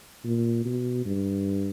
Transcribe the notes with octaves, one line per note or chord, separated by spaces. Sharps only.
A#2
B2
G2